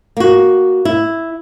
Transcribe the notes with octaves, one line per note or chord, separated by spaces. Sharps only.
A#3 F#4
E4